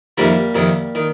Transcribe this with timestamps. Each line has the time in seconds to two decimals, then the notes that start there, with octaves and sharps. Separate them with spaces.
0.18 F2 C3 D#3 G3 A#3
0.55 F2 C3 D#3
0.95 D#3